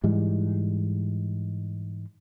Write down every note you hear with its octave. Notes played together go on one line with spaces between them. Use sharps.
G#2 E3 G3 G#3